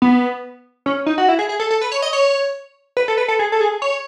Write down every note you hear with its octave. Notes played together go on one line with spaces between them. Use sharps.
B3
C#4
D#4
F#4
E4
G#4
G#4
A4
A4
B4
C#5
D#5
C#5
B4
A4
B4
A4
G#4
A4
G#4
C#5